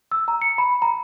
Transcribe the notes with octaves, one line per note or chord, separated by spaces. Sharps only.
E6
A#5
C#7
B5
A#5